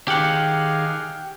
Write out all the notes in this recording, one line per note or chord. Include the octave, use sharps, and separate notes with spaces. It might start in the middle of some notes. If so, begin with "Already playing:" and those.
D#3 G4 G#4 F5 F#5